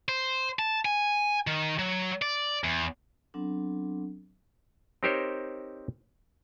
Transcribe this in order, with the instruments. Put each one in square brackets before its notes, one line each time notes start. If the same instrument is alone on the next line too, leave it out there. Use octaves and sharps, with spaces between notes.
[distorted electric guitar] C5
A5
G#5
D#3
F#3
D5
E2
[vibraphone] F#3 B3 C4 D4 A4
[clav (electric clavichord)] C4 D#4 G4 A#4 C5 C#5